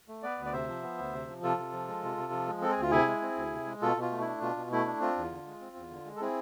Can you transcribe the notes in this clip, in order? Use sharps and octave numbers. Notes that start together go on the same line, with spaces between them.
A3
B3 B4 D5
D2
D5
C3 C5 E5
F3
B3
D2
C3
F3
C3 F4 A4
C3
F3
G#3
C3
C3
F3
G#3
C4 A4
G#4
D2 F4
C3 E4 G#4
G#3
C4
D2
C3
G#3
B2 F4 A4
B2 F4
A3
D4 E4
B2 F4
B2
A3 E4
D4
C4 F4
E2
D3
G#3
C4
E2
D3
G#3
A4
C4 E4 G#4